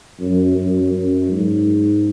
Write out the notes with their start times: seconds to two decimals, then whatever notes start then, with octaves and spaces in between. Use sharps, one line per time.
0.20 F#2
0.57 F#2
0.94 F#2
1.31 G#2